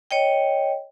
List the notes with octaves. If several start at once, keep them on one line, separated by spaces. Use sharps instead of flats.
C#5 D#5 G5